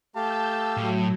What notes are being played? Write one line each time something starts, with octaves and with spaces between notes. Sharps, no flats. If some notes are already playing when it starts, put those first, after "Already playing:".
A3 G4 F5 A5 E6 G6
A2 F#3